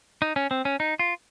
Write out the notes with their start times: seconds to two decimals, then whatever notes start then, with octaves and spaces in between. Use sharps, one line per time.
0.22 D#4
0.36 C#4
0.51 C4
0.65 C#4
0.80 D#4
0.99 F4